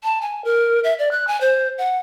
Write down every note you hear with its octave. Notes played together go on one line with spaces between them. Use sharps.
A5
G#5
A#4
E5
D5
F#6
G#5
C5
F#5